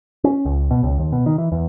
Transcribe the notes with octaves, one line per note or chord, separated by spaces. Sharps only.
C#4
C#2
B2
C#2
D#2
B2
D#3
E3
E2